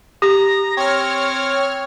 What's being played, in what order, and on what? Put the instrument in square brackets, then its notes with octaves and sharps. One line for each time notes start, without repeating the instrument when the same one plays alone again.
[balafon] G4 [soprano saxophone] A#5
[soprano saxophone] C4 [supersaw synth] C#5 F6